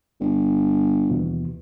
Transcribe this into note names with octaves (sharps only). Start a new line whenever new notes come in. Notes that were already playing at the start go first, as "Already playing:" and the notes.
G1
D#2 B2 E3